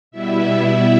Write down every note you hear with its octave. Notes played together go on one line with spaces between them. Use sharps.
B2 G3 B3 E4 E5